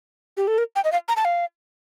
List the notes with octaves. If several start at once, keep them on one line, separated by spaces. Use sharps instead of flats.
G4
A4
A#4
G5
D#5
F5
A#5
A5
F5